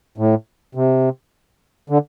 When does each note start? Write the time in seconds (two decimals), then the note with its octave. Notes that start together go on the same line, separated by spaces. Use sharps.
0.18 A2
0.75 C3
1.90 D3